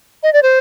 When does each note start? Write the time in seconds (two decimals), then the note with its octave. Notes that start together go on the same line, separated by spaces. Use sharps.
0.23 D#5
0.33 D5
0.43 C5